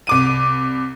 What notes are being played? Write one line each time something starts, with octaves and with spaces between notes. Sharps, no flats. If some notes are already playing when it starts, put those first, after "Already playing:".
C2 D6 D#7